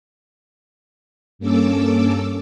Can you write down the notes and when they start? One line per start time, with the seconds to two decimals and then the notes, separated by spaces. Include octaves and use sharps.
1.39 G2 A#3 C#4 A4 D6 E6